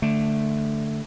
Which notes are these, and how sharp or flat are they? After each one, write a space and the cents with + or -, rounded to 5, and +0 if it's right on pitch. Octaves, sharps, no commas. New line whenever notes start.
D3 +0 A3 +0